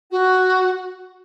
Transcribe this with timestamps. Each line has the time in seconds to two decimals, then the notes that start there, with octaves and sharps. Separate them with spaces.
0.11 F#4